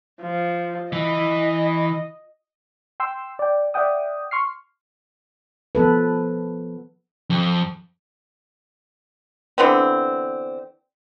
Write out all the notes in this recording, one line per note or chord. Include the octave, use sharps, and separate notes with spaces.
F3
E3 D#5
G5 C6 E6
D5 G5
D5 E5 F#5 G5 D#6
C6 C#6 F6 C7
F3 B3 A4 B4
F2
D3 E3 B3 C4